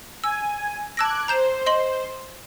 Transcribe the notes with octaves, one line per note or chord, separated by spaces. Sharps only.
G#5 E6
A5 D6 E6 F#6 G#6 A#6
C5 A#5 G6 E7
D#5 C6 F#7